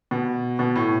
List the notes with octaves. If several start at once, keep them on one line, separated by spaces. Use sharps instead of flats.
B2
B2
A2